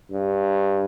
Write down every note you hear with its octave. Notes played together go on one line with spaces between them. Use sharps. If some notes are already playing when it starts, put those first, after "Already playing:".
G2